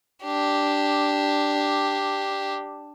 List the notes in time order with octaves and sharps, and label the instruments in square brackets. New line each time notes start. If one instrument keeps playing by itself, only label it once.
[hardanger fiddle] D4 G4